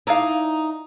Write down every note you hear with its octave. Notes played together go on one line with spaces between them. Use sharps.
D#4 E4 D5 F5